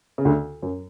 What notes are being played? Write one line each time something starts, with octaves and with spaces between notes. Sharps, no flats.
C#3
D2 D3
F#2 F#3